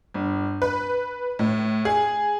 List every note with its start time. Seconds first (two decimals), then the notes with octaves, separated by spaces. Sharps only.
0.14 G1
0.62 B4
1.39 A2
1.85 G#4